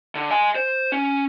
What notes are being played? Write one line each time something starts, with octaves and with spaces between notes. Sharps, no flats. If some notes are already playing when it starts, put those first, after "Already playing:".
D3
D#5 G#5
C5
C#4